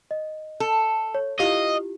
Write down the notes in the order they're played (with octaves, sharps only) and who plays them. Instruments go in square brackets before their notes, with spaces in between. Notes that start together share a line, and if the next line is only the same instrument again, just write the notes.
[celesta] D#5
[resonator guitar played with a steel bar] A4
[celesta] C#5
[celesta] E4 F4 G4 [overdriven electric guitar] D#5 [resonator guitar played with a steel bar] F5